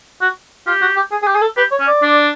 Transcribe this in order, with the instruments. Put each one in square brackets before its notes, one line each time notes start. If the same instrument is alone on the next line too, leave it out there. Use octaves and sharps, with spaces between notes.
[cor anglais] F#4
[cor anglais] F4 [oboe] G4
[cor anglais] F#4
G4
G#4
G#4
G4
G#4
A4
[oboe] G4 [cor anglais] B4
[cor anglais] C#5
[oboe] C#4
[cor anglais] D5
[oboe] D4